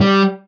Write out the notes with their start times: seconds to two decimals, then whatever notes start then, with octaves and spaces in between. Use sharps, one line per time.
0.01 G3